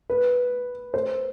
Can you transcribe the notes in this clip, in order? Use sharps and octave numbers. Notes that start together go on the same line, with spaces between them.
B4
C5